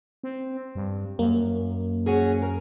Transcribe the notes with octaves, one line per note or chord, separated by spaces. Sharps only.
C4
G2
F#2 A#3
C#4 F#4 G#4
A#4